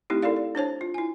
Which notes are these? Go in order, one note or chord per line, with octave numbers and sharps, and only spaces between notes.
A3 C4 D#4 E4 G4
D#4 E4 A4 A#4 D5 F5
D5
D4 C5 C#5 A5
F4
E4 G#5